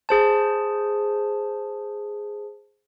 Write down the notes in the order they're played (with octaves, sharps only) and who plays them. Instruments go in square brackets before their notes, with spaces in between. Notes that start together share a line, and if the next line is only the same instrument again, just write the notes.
[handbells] G#4 C5 A5